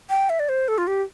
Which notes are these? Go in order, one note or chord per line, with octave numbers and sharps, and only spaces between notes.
G5
E5
D5
C5
A4
F4
G4